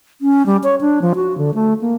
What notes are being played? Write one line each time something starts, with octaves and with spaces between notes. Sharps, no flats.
C#4
G3
C#5
D4
F3
F#4
D3
A3
A#3